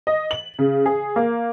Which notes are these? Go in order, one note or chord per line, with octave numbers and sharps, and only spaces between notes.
D#5
F#7
C#3
G#4
A#3